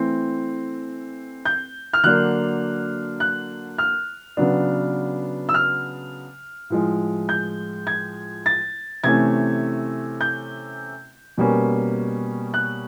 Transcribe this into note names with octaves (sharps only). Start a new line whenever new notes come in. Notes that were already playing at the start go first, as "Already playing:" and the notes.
Already playing: E3 A3 C4
G6
F6
D3 F#3 A#3 D4 F#6
F#6
F6
C#3 F#3 B3 D4
E6
F6
A2 F3 G#3
G6
G#6
A6
C3 E3 A3 C#4 G#6
G6
B2 G3 A#3 C#4
F#6